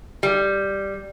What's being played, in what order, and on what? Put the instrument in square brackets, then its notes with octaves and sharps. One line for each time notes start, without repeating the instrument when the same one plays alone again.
[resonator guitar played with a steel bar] G3